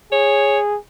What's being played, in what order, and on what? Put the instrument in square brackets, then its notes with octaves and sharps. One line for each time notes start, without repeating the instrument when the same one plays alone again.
[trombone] G#4 [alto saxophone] C#5